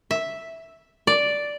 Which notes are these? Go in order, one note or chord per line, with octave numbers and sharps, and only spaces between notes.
E5
D5